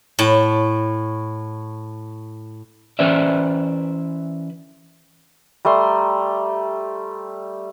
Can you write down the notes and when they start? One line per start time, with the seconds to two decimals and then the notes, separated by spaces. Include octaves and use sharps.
0.19 A2 A5
2.99 E3 C#4 B4 C5 D5 E5
5.65 G3 A3 A#5 C6